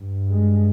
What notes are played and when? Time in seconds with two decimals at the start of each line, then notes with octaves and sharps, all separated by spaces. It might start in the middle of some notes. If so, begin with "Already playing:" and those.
Already playing: G2
0.29 G#3